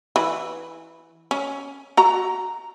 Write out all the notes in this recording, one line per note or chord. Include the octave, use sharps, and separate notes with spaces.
E3 B4
C#4
F#4 A#5